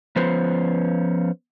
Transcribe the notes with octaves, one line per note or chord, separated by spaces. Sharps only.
F3 B3 C#4 B4 C5